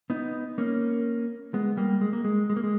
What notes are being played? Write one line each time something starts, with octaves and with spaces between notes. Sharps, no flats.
B3 D#4
A#3 C#4
G#3 B3
G3 A#3
G#3
A#3
G#3
G#3
A#3
G#3